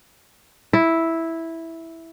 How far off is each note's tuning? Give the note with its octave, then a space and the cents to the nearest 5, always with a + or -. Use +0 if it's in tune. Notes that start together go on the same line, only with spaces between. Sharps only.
E4 -5